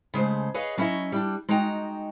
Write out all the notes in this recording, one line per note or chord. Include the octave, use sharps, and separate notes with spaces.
C#3 G#3 A3 C5
G#4 B4 C#5 D#5 F5
F#3 C#4 E4 D#5 E5
G3 D4
G#3 D#4 F#4 G5 A#5